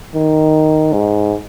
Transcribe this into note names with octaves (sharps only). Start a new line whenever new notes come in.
D#3
G#2